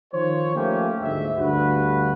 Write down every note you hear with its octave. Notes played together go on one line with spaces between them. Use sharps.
D#3 F3 C5 C#5
F3 A3 A#3 C#4 G4
G1 D2 G#2 E5
D2 G2 F#4 B4